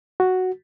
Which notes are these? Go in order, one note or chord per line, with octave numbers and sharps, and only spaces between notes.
F#4